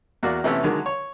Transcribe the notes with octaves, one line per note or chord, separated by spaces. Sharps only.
E2 A#3 F#4 D5 D6
C3 E3 A3 B3 C#4 E4
D3 D#3 F#3 G#3
C#5